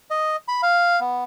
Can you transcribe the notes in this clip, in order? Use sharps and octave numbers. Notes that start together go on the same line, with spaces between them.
D#5
B5
F5
B3